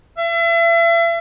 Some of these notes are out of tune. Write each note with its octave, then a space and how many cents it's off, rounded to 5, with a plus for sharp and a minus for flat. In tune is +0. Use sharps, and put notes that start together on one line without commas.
E5 +40